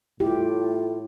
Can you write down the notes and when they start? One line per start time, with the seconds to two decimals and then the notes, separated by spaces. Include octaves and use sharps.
0.20 A2 E4 F4 G4